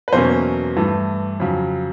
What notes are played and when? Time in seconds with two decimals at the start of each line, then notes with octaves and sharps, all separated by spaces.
0.08 B4
0.13 E2 B2 F#3 A#3 C#4 C5
0.77 G2 E3 A3
1.40 F2 C#3 F#3